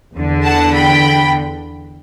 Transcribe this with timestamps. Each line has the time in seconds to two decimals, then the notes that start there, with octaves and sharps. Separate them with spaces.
0.14 E2 D3
0.44 F#5 A5
0.74 G5 B5